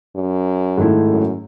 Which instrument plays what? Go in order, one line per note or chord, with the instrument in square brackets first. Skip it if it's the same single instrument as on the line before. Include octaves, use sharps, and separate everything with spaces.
[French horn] F#2
[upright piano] G#2 D#3 A3 E4
[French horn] F#2